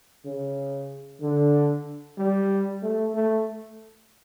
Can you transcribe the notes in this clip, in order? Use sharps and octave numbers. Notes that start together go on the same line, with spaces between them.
C#3
D3
G3
A3
A3